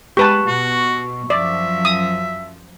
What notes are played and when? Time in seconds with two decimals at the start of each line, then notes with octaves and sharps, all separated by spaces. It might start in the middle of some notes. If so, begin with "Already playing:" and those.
0.17 G#3 G4 B4 A5 C#6
0.47 B2 F#4
1.30 F#2 F3 F#3 D5 E5
1.85 D#6